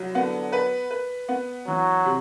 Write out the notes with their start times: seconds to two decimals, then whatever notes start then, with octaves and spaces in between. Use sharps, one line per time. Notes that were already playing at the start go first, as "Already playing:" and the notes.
Already playing: C2 F#3
0.15 D3 B3
0.52 B4
0.91 B4
1.29 B3
1.67 E3 F#3
2.05 C3